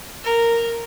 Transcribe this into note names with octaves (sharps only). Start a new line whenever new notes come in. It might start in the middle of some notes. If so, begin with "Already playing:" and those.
A#4